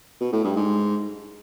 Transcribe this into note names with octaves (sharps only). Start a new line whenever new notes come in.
B2
A2
G2
G#2